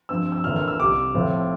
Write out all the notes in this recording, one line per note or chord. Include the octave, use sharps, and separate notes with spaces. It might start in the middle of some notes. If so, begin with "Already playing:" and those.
G2 F3 C4 E6
E6
A2 E3 A#3 D4 F4 F6
F6
E6
C2 C3 G3 D6
A2 F3 C4 F4